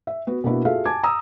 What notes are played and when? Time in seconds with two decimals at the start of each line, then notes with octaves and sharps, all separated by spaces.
0.07 E5
0.27 B3 F#4
0.44 B2 A#3 D4 E4 F#4
0.65 F4 F#4 G#4 A4 E5 F5
0.86 G#5 A5 D6 G#6
1.03 A#5 D#6 E6